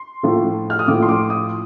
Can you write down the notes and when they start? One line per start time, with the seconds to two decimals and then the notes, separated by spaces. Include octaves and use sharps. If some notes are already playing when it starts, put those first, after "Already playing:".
Already playing: C6
0.23 A2 F3 A3
0.70 F6
0.79 D#6
0.88 A2 F3 A3 D6
1.02 C6
1.09 D6
1.30 D#6